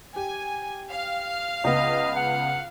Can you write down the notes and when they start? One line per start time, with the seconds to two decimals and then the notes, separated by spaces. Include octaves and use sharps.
0.16 G4 G#5
0.91 F5
1.64 C#2 B3 D#5
2.16 F#5